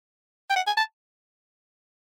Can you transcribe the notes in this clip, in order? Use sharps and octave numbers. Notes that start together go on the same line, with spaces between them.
G5
F#5
G#5
A5